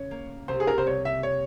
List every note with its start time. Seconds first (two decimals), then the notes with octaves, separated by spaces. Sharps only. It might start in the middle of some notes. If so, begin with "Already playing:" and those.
Already playing: C#3 C#5
0.11 A#3
0.48 C2 C5
0.60 G#4
0.67 A#4
0.78 C5
0.86 G3 C#5
1.05 E5
1.23 C#5